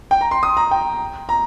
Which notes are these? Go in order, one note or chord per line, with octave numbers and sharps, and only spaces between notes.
G5
A#5
C6
D#6
A#5
G5
A#5